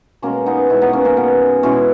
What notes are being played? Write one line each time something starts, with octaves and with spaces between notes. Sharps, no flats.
B2 G#3 A#3 C#4
B3 D#4
B2 G#3 C#4 E4
B3 D#4
A#3 C#4
A#3 C#4
B2 G#3 B3
B2 G#3 C#4 E4